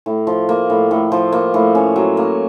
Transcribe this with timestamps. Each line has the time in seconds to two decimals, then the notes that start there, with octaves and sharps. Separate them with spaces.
0.06 A2
0.27 F3
0.49 A#3
0.70 A2
0.91 A2
1.12 F3
1.32 A#3
1.54 A2
1.75 C#4
1.96 F#3
2.17 A#3